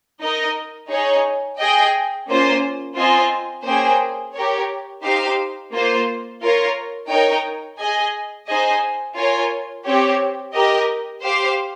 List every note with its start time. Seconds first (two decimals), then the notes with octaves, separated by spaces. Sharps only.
0.21 D#4 A#4 D#5
0.91 D#4 G#4 C#5
1.59 G#4 D#5 G5
2.28 A#3 C#4 F4 C5
2.97 C4 F4 C5 D#5 G#5
3.66 A#3 C#4 G#4 C5 G5
4.35 G4 A#4 C#5
5.04 D#4 G4 C5 F5
5.73 A#3 F4 C5
6.41 F4 A#4 C#5
7.10 D#4 A#4 C#5 G5
7.79 G#4 D#5 G#5
8.48 D#4 G#4 C5 D#5 G#5
9.17 F4 A#4 C#5 G#5
9.86 C4 G4 C#5
10.54 G4 A#4 D#5
11.23 G4 C5 F5